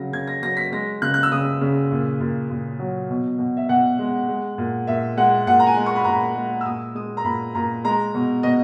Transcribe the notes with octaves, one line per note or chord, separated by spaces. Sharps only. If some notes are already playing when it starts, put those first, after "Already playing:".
Already playing: C#3 F#3 A#6
C#3 G#6
A#6
F#3 A#6
B6
G#3 A#6
C#3 F#6
F#6
E6
C#3 D#6
C#3
A#2
A#2
A#2
F#3
B2
B2
E5
B2 F#5
G#3
G#3
A#2
A#2 E5
G#3 F#5
A#2 F#5
A#5
G#5
G#3
C#6
B5
A#2 A#5
B5
G#3
E6
A#2 D#6
G#3 D#6
A#5
A#2 B5
A#2 A#5
G#3 A#5
B2
B2 D#5